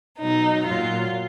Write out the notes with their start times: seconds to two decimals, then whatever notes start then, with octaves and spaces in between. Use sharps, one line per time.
0.19 B2 F#3 D#4
0.66 A#2 F#3 F4